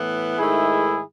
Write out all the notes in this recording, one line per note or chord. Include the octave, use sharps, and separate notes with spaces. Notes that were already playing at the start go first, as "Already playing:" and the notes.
Already playing: A2 E3 B3
G#2 D#3 A3 E4 G#4